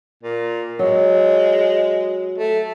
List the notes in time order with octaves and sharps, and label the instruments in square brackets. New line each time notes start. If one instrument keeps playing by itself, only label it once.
[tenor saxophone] A#2
[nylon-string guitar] F#3 [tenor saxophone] G#3
[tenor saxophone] A3